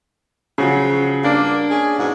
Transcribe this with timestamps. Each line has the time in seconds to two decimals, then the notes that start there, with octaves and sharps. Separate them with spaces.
0.58 C#3 F3 F#3
1.24 G2 A#3 D4
1.70 C#4 G#4
1.98 G#2 B2 E3